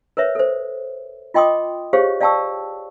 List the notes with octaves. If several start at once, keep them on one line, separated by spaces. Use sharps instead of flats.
A#4 B4 C#5 E5
A4 C5
F4 D#5 G5 C6 D6 D#6
G4 G#4 C5 C#5 F5
D5 F5 G5 A5 C#6 E6